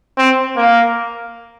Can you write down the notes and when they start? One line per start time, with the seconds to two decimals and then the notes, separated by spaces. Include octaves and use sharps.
0.17 C4
0.57 A#3